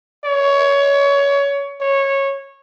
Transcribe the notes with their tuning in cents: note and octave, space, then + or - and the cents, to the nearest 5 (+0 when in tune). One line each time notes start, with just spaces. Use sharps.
C#5 +20
C#5 -15